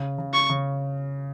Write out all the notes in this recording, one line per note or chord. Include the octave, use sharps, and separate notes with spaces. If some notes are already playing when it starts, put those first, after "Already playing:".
Already playing: C#3
C#3
C#6
C#3